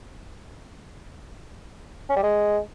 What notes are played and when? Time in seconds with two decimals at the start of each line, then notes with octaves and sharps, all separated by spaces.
2.09 C#4
2.16 G3
2.23 G#3